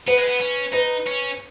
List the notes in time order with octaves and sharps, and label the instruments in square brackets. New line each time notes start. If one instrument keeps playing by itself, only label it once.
[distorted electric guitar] B3 [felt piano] B4
[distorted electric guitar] G#3
B3
C#4
[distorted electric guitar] D#4 [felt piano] B4
[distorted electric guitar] C#4